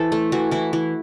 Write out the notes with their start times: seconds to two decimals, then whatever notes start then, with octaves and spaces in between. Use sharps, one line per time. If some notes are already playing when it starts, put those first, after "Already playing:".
Already playing: E3 A4 C5
0.12 A3
0.32 E3 F#4
0.51 E3 E4
0.73 E3